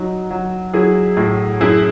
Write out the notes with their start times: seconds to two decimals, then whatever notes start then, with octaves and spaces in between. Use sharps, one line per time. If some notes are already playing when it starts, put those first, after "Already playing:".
Already playing: F#3 D#4 F#4
0.31 F#3
0.74 F#3 E4 G#4
1.17 A2
1.60 F#2 E4 G#4